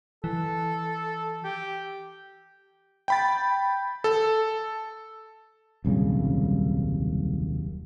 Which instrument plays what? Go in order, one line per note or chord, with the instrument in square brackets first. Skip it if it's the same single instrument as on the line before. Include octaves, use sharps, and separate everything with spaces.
[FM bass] E3 [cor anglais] A4
[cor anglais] G4
[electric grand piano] G5 B5 A6
A4
[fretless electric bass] D#1 C2 F#2 C#3